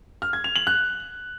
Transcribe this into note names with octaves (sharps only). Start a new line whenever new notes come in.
F6
G#6
F7
F#7
F#6